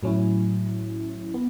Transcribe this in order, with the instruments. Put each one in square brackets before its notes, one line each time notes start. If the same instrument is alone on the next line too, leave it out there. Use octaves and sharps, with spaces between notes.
[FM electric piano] A2 F#3 C#4 E4
B3